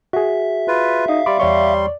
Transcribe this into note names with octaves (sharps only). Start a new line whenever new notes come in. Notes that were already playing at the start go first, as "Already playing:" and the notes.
F#4 G#4 E5
F4 B4
D#4 E5 F5
G3 D5 B5 C6 D6
E2 G3 C#5 D5 C6 C#6